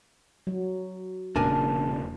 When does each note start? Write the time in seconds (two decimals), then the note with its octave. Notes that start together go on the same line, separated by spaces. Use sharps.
0.47 F#3
1.36 E1 A#2 C#3 D4 A#4 G#5 A5